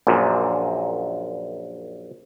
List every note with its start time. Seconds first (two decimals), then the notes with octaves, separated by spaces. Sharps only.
0.07 A#1 F#2 A#2